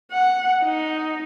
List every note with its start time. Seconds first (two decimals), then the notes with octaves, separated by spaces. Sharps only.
0.12 F#5
0.63 D#4